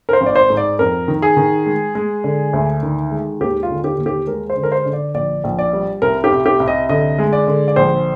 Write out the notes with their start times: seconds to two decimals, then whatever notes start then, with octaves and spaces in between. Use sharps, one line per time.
0.09 A#4
0.13 C5
0.21 G#1
0.26 D5
0.36 C5
0.50 G#2
0.57 D5
0.79 F2 A#4
1.08 D#3
1.22 G#4
1.37 D#3
1.66 G#3
1.95 G#3
2.24 D3
2.53 D2
2.83 D#3
3.11 G#3
3.41 D#2 G4
3.63 F4
3.70 D3
3.84 G4
3.98 D#2
4.06 G4
4.27 G#3 A#4
4.50 C5
4.56 D3
4.63 A#4
4.72 C5
4.86 D3
4.93 D5
5.14 A#1 D5
5.44 A#1
5.59 D5
5.73 G3
6.02 C2 A#4
6.24 G4
6.32 C2
6.46 G4
6.60 C2
6.68 D#5
6.89 D3 D#5
7.19 G#3
7.33 D5
7.47 D3
7.68 D5
7.76 A#1 C5